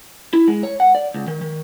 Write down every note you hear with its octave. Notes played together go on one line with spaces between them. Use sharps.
E4
G#3
C#5
F#5
D5
C#2
D#3
D#3